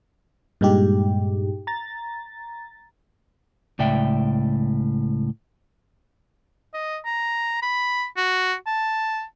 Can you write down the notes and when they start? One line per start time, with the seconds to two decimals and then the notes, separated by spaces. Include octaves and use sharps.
0.61 G2 A#2 G#3 D#4 G4
1.67 A#5 A6
3.79 C#2 A2 D5 E5 G5
6.74 D#5
7.05 A#5
7.63 B5
8.17 F#4
8.67 A5